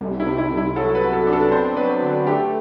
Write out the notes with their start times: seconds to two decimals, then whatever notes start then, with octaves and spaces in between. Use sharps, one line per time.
0.01 C2
0.20 E4
0.26 C3
0.38 E4
0.51 C2
0.57 E4
0.76 F#3 A4
0.95 B4
1.01 B3
1.13 A4
1.27 D4
1.33 A4
1.51 C4 C5
1.77 F#3 B4
2.02 D3
2.27 A3 G4